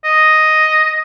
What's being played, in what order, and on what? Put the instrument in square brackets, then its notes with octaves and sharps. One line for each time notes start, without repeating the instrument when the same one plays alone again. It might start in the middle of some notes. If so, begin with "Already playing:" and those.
[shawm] D#5